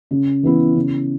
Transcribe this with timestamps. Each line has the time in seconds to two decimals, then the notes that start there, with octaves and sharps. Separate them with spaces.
0.11 C#3
0.43 E3 B3 E4
0.75 C#3